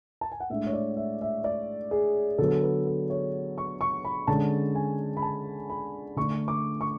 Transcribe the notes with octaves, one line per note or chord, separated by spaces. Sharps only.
A5
G#5
F#5
A2 G#3 D4 E5
C#5
D5
E5
E5
D5
G#4
D3 F#3 B3 A4
B4
A4
C#5
C#6
C#6
B5
D3 G#3 C#4 A5
G#5
B5
A5
B5
D3 A3 D4 C#6
D6
C#6